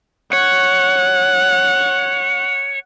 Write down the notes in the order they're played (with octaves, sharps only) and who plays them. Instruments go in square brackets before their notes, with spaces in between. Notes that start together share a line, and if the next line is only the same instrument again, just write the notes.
[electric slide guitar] C#5 [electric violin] F#5